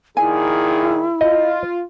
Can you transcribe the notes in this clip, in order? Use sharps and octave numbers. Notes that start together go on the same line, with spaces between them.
A#2 D#3 E4 G#4 G#5
F4 D#5